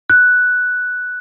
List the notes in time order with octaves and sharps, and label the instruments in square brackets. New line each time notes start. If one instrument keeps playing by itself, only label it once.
[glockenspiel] F#6